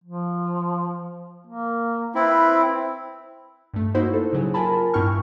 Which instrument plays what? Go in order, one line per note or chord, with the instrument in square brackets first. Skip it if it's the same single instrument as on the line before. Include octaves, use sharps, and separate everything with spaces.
[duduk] F3
A#3
[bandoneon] C4 E4 [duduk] B4
[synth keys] G2 A3
A#3 D#4 E4 F#4 C5
A4
C#3 F#3 G#4
F4 A#4 G#5 A5 B5
G2 B3 E4 G5 C#6 F6